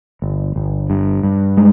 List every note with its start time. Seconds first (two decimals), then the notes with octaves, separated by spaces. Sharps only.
0.22 G1
0.56 G1
0.90 G2
1.23 G2
1.57 G#3